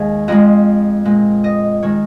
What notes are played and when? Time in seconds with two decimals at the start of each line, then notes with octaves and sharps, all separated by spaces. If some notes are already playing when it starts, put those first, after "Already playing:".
Already playing: D#2 D#3 G#3 G#4 D#5 F5
0.28 F2 F3 G#3 D#5
1.05 A#2 G#3
1.44 D#5
1.83 D#3 G#3 C#5